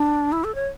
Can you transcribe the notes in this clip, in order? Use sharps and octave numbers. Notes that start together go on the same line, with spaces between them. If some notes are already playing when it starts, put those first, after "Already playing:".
Already playing: D4
E4
A4
C#5